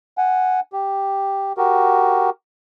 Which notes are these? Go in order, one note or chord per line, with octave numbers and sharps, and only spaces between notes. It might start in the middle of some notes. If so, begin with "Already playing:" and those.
F#5 G#5
G4
F#4 G4 A#4